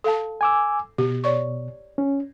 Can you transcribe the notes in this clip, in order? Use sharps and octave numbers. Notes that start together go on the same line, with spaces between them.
A4 F5 A5
G#5 D6 E6
B2 G4
C#5 D5 C#6
C#4